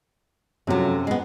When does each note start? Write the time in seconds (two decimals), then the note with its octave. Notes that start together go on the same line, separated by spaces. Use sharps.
0.67 F#2 C3 F3 F#3 A3
1.07 G#3 B3